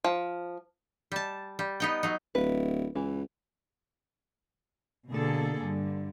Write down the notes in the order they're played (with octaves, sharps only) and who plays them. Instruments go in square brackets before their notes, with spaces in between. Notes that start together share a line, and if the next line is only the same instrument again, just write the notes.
[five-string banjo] F3
[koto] G3 A5
G3
B3 D#4 G5
F#3 D#4
[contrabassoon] D1 [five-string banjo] B4
[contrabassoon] C#2 [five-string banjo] E3
[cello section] B2 D3 A#3 G#4 A4
G2 D3